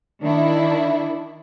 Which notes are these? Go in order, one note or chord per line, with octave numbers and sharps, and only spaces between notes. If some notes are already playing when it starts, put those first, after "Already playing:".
D#3 D4 E4